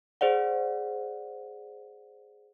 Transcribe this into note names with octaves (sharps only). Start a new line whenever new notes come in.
G#4 C5 D5 F#5